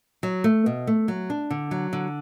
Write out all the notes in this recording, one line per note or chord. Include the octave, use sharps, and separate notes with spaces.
F#3
A3
B2
A3
F#3
D4
D3
F#3
D3